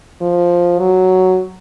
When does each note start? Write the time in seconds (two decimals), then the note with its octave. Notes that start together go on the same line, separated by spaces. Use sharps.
0.21 F3
0.79 F#3